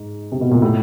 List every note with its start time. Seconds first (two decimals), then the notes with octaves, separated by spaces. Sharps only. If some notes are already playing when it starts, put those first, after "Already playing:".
Already playing: G#2
0.32 C3
0.41 B2
0.51 A#2
0.62 A2